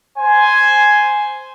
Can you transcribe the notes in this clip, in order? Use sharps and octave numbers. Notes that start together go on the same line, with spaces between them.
C5 G#5